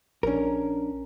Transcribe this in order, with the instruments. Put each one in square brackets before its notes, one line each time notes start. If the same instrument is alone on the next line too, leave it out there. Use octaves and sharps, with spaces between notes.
[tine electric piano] A#1 D4 [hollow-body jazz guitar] C#4 A#4